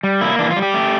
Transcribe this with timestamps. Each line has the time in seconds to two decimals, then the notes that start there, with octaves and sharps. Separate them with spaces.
0.04 G3
0.21 A#3 E4
0.39 E3 D4
0.51 F4
0.56 G3
0.62 G4
0.74 A3